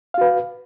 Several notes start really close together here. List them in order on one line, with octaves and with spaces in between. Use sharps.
F5 F#4 B4